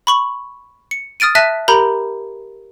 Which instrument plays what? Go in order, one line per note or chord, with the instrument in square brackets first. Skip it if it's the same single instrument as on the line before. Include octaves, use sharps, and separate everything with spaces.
[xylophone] B5 C#6 F#7
C#7
D#6 F6 A6 D7 D#7
E5 A5 F#6 A#6 B6 D#7
G4 A#4 A#5 B5 G6 F#7